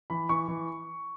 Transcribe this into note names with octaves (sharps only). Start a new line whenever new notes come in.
E3 B5
E3 C#6
E3